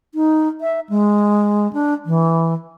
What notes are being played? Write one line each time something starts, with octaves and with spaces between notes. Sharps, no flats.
D#4
E5
G#3
D4
E3